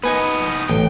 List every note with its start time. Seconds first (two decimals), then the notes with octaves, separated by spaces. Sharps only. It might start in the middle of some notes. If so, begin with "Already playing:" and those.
0.04 B3 D#4 B4 G#5
0.69 A1 G5